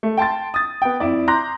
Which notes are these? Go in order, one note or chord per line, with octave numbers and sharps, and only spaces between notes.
A3
G5 A5 C6 A6
D#6 A6
B3 G5
F2 E4 D5
A#5 C6 D6 F#6 G6 A#6